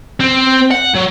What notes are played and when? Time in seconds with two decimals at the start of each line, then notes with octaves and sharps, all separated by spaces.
0.21 C4
0.71 F#5
0.94 F#3